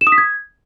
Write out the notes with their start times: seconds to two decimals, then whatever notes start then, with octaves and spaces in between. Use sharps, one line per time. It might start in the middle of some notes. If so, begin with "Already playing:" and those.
0.01 E7
0.07 D#6
0.12 B6
0.18 G#6